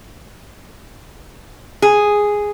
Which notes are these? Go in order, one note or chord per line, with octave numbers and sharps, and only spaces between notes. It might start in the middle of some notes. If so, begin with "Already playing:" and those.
G#4